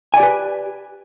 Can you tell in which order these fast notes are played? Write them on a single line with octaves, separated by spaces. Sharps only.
G#5 D5 G4 B4